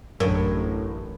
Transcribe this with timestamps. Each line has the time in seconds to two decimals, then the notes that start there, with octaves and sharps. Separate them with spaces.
0.20 A1 F#2 A2 D3 A#4